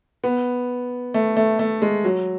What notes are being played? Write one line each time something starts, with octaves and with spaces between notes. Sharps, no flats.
B3
A3
A3
A3
G#3
F#3